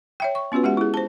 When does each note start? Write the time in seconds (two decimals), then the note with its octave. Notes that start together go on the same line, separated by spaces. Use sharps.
0.20 C#5 E5 G5
0.35 C#6
0.52 B3 C#4 F4 F#4 B4
0.63 G#3 G4 E5 F#5
0.77 E4 G#4
0.94 C5 A5